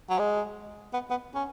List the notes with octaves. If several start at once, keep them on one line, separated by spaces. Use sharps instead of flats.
F#3
G#3
B3
B3
C#4